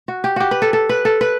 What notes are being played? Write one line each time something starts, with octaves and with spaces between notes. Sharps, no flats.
F#4
G4
F#4 G4
B4
A4
A4
B4
A4
B4